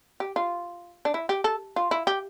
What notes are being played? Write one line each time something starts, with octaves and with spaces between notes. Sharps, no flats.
G4
F4
D4
E4
G4
A4
F4
E4
G4